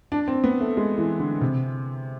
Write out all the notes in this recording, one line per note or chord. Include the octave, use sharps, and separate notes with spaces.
D4
C4
B3
A3
G#3
E3
D3
C3